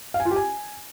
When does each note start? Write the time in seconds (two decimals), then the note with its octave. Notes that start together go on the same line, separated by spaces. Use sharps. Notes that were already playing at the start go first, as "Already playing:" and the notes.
0.14 F5
0.20 G#5
0.25 F4
0.31 G4
0.36 G#5